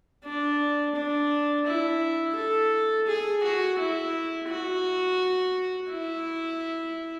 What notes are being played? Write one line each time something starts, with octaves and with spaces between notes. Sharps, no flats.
D4
D4
E4
A4
G#4
F#4
E4
F#4
E4